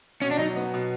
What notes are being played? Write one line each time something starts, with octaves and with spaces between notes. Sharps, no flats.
B2 C#4
D4
F#3 D#4
B3
B2